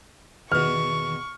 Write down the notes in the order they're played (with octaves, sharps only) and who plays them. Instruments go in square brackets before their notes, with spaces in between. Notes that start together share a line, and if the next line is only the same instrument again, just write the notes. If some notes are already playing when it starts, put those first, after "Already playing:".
[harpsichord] E2 B2 [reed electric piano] D#3 B3 [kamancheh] C#6 [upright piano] F6